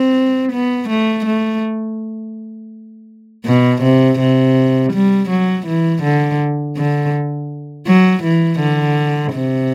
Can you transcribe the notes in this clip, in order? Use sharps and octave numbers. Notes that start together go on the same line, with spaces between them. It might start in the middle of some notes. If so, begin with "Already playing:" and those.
Already playing: C4
B3
A3
A3
B2
C3
C3
G3
F#3
E3
D3
D3
F#3
E3
D3
C3